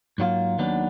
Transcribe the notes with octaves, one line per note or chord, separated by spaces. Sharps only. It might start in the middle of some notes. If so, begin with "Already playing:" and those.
G#2 F#3 A#3 F4
D#2 D#3 F#3 B3 D4